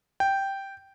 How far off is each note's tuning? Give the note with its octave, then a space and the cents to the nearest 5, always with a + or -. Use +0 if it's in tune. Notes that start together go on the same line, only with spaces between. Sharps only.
G5 -5